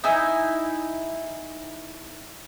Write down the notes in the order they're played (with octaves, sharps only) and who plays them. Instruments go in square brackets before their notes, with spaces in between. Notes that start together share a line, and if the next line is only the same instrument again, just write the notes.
[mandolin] D#4 E4 G#5